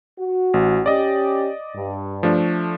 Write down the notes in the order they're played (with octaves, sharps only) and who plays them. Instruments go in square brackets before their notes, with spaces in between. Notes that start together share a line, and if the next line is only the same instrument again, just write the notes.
[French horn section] F#4
[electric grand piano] A1
[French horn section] C#4 G4 [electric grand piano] D5 D#5
[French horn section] G2
[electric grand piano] F3 A3 D4